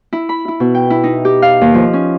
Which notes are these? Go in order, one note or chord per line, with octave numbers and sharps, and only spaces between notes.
E4
B5
E4
B2
G5
E4
D#4
G4
F5
D#2
F3
C#4